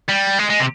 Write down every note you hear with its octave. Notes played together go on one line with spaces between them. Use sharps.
G3
G#3
G#3
C3